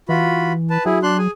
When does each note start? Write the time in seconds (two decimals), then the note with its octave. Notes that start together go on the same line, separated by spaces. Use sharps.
0.09 E3 F4 F#4 B5
0.70 B4 A5
0.86 F#3 E4 G#4
1.03 D4 C6 F#6
1.18 G#4 G#5